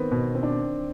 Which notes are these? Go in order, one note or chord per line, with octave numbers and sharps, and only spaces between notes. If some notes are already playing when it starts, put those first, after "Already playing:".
Already playing: D#3 B3 C4
B2
C4
D4